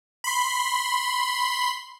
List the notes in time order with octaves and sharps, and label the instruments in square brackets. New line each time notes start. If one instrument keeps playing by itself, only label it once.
[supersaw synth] B5 C6